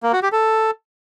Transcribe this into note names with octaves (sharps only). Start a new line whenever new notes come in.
A#3
F#4
G4
A4